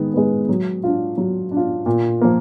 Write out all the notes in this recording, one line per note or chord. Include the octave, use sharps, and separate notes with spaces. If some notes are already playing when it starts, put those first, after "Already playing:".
Already playing: D#3 G#3 B3
G#3 B3
F#3
D4 F4
F#3
D4
F4
A#2
F3 A#3